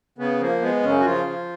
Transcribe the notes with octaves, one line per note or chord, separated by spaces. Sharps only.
C#3 B3
F3 A#3
G#3 B3
F#2 C#3 C#4
F#4
C#3 F3 F4
F3